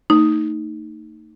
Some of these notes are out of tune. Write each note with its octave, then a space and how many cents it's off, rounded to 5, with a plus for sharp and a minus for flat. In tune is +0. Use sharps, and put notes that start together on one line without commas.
A3 +40 D#4 +0